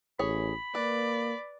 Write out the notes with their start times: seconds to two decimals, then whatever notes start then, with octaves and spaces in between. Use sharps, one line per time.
0.19 A1 G#4 C#5 B5
0.75 A#3 B4 D5